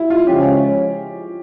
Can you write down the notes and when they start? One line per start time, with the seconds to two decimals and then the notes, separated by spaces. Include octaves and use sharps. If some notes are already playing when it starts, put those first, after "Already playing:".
Already playing: E4
0.10 F4
0.27 C#3 F3 G#3 C#4 G4